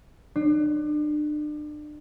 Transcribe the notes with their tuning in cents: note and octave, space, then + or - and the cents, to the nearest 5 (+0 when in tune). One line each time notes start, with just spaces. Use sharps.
D4 +35